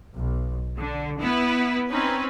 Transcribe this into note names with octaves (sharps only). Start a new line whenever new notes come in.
B1
D3
B3 E4 B4
C4 C#4 D#4 B4